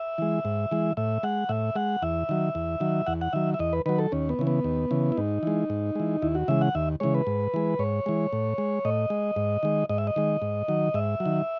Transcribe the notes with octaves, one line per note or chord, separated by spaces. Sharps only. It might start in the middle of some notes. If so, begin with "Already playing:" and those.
Already playing: E5
E3 G#3
G#2
E3 G#3
A2 E5
G#3 F#5
A2 E5
G#3 F#5
E2 E5
D#3 F#3
E2
D#3 F#3
E2 F#5
F#5
D#3 F#3 E5
E5
E2 D#5
B4
D#3 F#3 B4
A4
D#2 C#4
B3
C#3 E3
B3
D#2
C#3 E3
E4
G#2 D#4
E3 G#3
G#2
E3 G#3
D#2 E4
F#4
C#3 E3 G#3 E5
F#5
D#2 E5
C#3 E3 G#3 C#5
B4
G#2
E3 G#3
G#2 C#5
E3 G#3
A2
G#3
A2 D#5
G#3
G#2
D#3 G#3
G#2 D#5
E5
D#5
D#3 G#3
G#2
D#3 F#3
G#2 E5
F#3
D#3